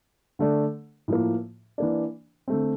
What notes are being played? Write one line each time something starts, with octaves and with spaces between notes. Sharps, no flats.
D3 A3 D4
A2 F3 A#3
E3 A#3 D4
D3 A3 C4